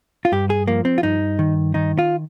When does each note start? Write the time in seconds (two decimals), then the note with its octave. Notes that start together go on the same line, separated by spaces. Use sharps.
0.25 F4
0.32 G2 G4
0.50 G#4
0.67 F3 A#3
0.85 C4
0.98 F4
1.03 G2 D#4
1.39 D#3
1.74 D#3 D#4
1.99 F4